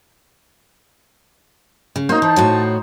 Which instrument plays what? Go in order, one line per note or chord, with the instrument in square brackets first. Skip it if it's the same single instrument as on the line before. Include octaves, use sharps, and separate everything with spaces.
[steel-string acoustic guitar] C#3
[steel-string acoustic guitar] A#3 C#4 F#4 [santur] D#4 C5
[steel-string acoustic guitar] E3 [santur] C5 [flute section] A5
[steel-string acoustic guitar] A2 F#4 C#5